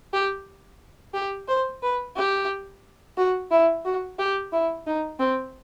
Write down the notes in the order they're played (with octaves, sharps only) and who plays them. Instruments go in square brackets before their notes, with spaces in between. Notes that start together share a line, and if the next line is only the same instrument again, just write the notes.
[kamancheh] G4
G4
C5
B4
G4
F#4
E4
F#4
G4
E4
D#4
C4